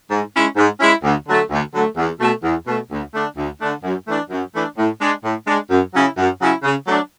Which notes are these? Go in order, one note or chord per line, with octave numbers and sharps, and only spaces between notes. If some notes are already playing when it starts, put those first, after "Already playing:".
G#2
G#3 C#4 E4
G#2
G#3 C#4 E4
D2
D3 F#3 A3
D2
D3 F#3 A3
E2
B2 A3
E2
B2 A3
D2
D3 A3 D4
D2
D3 A3 D4
F#2
E3 A3 D4
F#2
E3 A3 D4
A2
G#3 D4
A2
G#3 D4
F#2
C#3 F#3 C#4 E4
F#2
C#3 F#3 C#4 E4
C#3
F#3 A3 D4